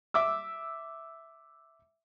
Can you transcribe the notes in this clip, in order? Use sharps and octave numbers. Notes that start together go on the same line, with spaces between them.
E5 D6 E6